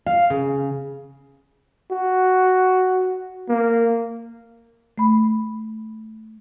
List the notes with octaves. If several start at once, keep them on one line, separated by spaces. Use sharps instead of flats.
F5
C#3
F#4
A#3
A3 B5